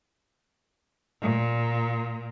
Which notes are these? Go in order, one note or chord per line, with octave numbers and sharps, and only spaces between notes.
A#2